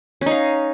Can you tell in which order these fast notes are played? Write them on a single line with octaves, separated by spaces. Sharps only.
C#4 D#4 F5